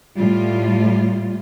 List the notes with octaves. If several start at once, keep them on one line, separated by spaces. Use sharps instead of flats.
A2 G3 F4